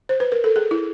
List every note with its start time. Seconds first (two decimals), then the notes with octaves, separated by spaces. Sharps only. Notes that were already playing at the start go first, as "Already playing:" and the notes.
0.09 C5
0.20 B4
0.32 A#4
0.44 A4
0.56 G#4
0.71 E4